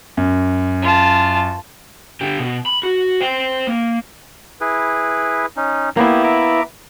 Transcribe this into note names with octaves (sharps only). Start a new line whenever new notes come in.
F#2
F4 A5
D3 G4
B2
B5
F#4
C5 G5
A#3
E4 G#4 B4
C#4 D#4
A#3 B3 E4 G4
E5 A#5 D6